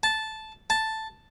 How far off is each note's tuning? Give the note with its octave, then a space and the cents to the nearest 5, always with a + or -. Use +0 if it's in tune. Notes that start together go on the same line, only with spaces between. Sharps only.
A5 -10
A5 +0